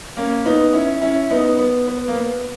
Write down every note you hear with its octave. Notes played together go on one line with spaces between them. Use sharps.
A#3 C#4
B3 D#4
C#4 E4
C#4 E4
B3 D#4
B3
B3
A#3
B3